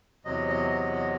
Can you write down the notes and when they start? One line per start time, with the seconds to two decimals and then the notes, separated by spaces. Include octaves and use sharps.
0.25 E2 C3 F#3 D#5
0.48 D#5
0.70 D#5
0.93 D#5